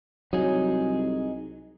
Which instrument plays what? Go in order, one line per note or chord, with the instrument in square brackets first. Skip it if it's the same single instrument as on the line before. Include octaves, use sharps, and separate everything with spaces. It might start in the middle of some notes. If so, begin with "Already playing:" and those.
[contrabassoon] C2 [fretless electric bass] F#3 [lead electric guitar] D#4 G#4